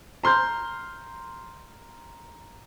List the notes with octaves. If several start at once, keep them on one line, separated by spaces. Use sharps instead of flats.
A#5 C6 F6 G6